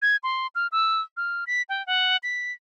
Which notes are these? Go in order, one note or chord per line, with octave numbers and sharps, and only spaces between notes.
G#6
C6
F6
E6
F6
B6
G5
F#5
B6